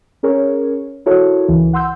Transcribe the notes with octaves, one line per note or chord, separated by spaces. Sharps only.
C#4 G#4 A#4 C#5
E4 F#4 A4 A#4 C#5
C#2 E3
F#5 C6 E6 G6